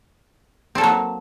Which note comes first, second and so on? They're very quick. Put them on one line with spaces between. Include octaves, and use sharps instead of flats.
C4 A4 A#3 F#3